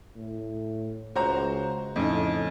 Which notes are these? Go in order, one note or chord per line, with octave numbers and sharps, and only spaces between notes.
A2
C#2 F#4 C5 A#5
F2 A2 C#3 D#4